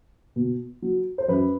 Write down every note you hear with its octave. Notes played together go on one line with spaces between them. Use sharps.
B2
F#3
C5
F#2 B4